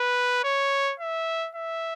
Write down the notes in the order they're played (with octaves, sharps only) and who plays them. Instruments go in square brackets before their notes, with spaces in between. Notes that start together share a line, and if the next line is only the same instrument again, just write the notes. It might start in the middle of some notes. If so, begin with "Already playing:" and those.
Already playing: [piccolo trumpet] B4
C#5
E5
E5